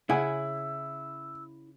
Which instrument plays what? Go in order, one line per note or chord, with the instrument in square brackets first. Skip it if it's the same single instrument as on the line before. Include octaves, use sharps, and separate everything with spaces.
[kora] C#3 [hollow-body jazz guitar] E4 [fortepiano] F#5 G#5 [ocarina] E6